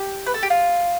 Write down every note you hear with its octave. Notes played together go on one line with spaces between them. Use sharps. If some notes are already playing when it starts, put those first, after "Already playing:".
Already playing: G4
B4
A4
G4
F4